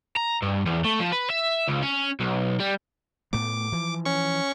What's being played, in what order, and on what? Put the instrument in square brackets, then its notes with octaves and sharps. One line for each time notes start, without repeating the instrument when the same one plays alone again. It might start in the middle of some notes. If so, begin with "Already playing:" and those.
[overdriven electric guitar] A#5
G2
E2
A3
F3
B4
E5
C#2
C#4
B1
G3
[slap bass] A2 A3 B3 [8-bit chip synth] D6
[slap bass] E3 F3
[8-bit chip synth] C#4 C#6